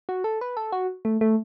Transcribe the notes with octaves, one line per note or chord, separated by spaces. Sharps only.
F#4
A4
B4
A4
F#4
A3
A3